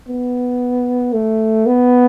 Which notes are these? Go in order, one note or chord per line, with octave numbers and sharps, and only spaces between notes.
B3
A3
B3